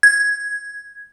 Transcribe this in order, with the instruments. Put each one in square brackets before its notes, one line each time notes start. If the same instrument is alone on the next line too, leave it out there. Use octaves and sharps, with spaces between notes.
[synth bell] G#6